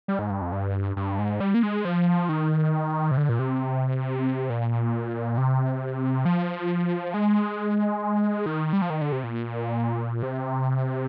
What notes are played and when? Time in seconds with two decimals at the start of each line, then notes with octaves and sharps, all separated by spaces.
0.08 G3
0.19 G#2
0.30 G2
0.41 F2
0.52 G2
0.97 G2
1.19 G#2
1.40 G3
1.54 A#3
1.63 G#3
1.85 F3
2.29 D#3
3.11 C3
3.17 D3
3.29 A#2
3.39 C3
4.50 A#2
5.38 C3
6.25 F3
7.14 G#3
8.46 D#3
8.73 G3
8.82 F3
8.90 D#3
9.01 D3
9.12 C3
9.24 A#2
10.23 C3